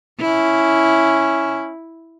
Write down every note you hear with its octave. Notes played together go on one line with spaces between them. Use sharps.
C#4 E4